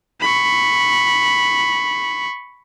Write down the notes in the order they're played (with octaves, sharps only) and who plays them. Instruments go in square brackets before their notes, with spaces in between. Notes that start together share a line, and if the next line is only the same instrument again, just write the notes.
[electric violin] B5 C#6